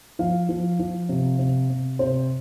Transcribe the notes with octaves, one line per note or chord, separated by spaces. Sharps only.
F3 F5
F3
F3
C3
C3
C3
C3 C5